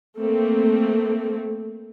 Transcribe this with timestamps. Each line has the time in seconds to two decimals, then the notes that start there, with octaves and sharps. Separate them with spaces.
0.19 A3 A#3 C4